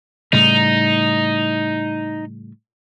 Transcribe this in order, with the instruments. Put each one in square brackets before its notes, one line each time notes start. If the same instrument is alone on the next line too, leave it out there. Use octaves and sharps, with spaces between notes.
[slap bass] A2 C#3 G3 [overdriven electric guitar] D#4